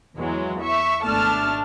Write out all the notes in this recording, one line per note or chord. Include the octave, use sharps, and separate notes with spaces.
E2 E3 F#3 G#3
E5 C#6
G#1 B2 A3 D4 A5 F6